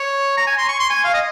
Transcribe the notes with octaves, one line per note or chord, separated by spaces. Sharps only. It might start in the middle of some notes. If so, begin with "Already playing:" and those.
Already playing: C#5
A#5
G#5
C6
C#6
C6
G#5
F5
D#5